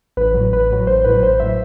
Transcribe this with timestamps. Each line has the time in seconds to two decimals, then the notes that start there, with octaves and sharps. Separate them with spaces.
0.17 A1 B4
0.34 A2 F#3
0.53 A1 B4
0.70 A2 F#3
0.87 A1 C5
1.05 A2 F#3 B4
1.22 A1 C5
1.40 A2 F#3 E5